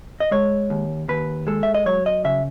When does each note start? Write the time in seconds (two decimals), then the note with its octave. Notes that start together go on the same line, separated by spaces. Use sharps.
0.20 D#5
0.31 G#3 C#5
0.70 D#2
1.08 D#2 B4
1.47 G#3 A4
1.63 E5
1.74 D#5
1.86 F#3 C#5
2.06 D#5
2.24 C#3 E5